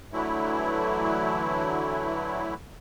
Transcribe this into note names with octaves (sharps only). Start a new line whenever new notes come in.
D3 E3 F#3 A3 E4